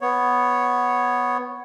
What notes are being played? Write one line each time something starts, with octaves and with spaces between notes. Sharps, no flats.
B3 C#5